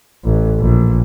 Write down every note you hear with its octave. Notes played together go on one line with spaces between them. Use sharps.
A1
A#1